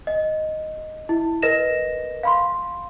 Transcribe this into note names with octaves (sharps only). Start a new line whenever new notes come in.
D#5
E4
A#4 B4 D#5 A#6 E7
F5 B5 C6